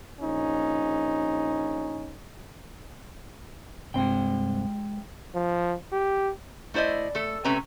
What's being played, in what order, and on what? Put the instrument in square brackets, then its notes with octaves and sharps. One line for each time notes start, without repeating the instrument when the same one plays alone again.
[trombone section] A#1 C#4 D#4
[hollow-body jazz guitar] C2 G2 C4 [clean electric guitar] G#3 G5
[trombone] F3
G4
[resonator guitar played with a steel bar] A3 E4 C5 D5 D#5
A3 A4
C3 A3 C#4 B4 A#5